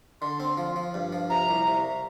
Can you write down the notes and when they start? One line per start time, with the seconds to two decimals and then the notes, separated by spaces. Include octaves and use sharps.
0.21 D3 C6
0.40 C4
0.57 F3
0.76 F3
0.94 G2
1.12 F3
1.30 C3 A#5
1.49 C2
1.67 C3